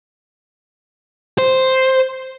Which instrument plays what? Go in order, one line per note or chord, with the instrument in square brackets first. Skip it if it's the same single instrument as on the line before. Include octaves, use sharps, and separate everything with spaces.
[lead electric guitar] C5